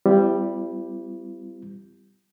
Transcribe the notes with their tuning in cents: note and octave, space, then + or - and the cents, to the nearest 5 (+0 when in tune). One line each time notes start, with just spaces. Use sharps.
G3 +0 C4 -40 E4 +40